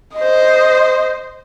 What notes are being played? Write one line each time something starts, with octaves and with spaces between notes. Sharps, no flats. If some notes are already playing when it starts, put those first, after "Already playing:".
C5 D#5